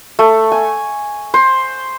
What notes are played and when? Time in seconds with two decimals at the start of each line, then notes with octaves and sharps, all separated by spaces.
0.19 A3
0.52 G#5
1.34 C5